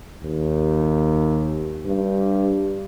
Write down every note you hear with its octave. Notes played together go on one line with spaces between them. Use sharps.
D#2
G2